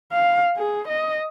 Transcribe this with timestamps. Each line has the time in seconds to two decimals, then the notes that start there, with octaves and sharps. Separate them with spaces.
0.12 F5
0.57 G#4
0.88 D#5